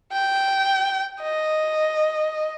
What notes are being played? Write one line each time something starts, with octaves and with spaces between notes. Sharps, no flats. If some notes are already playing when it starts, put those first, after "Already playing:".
G5
D#5